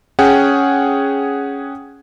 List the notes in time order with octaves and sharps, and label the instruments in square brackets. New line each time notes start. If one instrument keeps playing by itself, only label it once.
[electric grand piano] C#4 G#4 F#5 G5